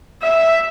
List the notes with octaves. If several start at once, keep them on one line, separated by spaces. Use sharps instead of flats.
E5